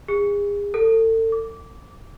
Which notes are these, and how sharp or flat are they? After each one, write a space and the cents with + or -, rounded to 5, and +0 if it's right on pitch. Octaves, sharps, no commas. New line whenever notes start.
G#4 -35
A4 +35
D6 -15